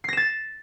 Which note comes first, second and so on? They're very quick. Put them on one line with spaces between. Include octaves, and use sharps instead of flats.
C7 A#6 E7 A6